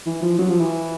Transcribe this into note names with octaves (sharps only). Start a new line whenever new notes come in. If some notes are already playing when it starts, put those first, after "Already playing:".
E3
F3
F#3
F3
E3